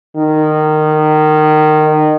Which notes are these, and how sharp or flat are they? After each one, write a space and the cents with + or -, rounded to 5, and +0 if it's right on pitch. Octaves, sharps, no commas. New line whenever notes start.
D#3 -20